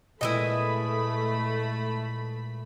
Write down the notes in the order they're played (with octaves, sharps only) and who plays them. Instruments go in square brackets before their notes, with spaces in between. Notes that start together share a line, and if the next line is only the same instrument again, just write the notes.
[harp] A#2 G#3 [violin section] A3 B5 [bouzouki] E4 B4 D#5